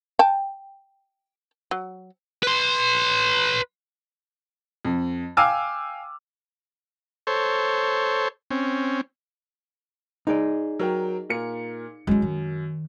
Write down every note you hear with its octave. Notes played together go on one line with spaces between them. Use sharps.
G5 A5
F#3
B4 C6
F2
F5 G5 G#5 D6 E6 F6
A4 C5 C#5
C4 C#4
D#4 G#4 D5
F#3 A#4 G5
A#2 A#4 C#7
F#2 G#3 E4
D#3